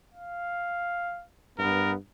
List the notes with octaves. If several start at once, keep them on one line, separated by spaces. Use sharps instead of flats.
F5
G2 B3 A#4